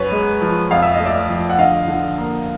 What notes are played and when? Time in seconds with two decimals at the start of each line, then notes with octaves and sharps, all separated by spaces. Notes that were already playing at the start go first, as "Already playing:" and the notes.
Already playing: F#2 B4 C#5
0.12 G#3
0.42 F3
0.71 F2 F5
0.82 E5
0.94 D#5
1.00 A3
1.06 D5 E5
1.29 F3
1.50 F#5
1.59 D3 D#5 F5
1.88 D3
2.18 A#3